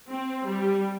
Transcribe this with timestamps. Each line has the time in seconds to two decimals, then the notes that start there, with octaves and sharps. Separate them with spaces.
0.10 C4
0.46 G3